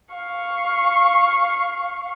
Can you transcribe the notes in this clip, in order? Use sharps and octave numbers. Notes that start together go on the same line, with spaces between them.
F5 C#6